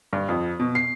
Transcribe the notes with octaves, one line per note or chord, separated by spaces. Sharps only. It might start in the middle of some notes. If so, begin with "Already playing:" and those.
G2
F2
B2
C7